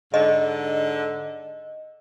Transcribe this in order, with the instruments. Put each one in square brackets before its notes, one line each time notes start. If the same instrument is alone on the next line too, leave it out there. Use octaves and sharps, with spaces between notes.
[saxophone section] G#2 D3 [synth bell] D#5